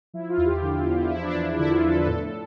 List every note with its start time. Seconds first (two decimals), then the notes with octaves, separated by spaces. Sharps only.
0.14 F3 E4
0.29 F4
0.37 E2
0.45 G4
0.61 D3
0.86 E2
1.10 F3 E4
1.22 D4
1.35 E2
1.58 D3 E4
1.70 F4
1.82 E2 A4
1.94 B4
2.06 A2 A4
2.23 A4
2.31 A2